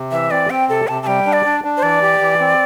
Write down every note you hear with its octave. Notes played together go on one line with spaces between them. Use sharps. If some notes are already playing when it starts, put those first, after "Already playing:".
Already playing: C3
E3 E5
C4 D5
C4 G5
C3 A4
C3 A5
A5
G3 G5
D4
D5
D4
D4
C5
E3 D5
G4
E3
C4